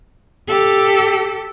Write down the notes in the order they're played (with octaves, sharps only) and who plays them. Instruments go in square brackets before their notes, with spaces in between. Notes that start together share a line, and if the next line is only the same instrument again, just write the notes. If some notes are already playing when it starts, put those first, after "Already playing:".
[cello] G4 A4